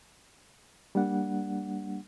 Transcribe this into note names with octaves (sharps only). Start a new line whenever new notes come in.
G3 A#3 D4 F#5